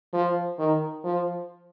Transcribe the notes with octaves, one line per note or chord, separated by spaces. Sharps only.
F3
D#3
F3